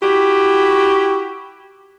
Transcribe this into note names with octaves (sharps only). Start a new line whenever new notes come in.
E4 F#4 G4